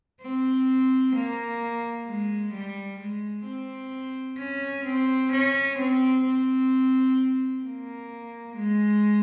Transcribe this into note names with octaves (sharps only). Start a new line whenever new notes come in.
C4
A#3
G#3
G3
G#3
C4
C#4
C4
C#4
C4
C4
A#3
G#3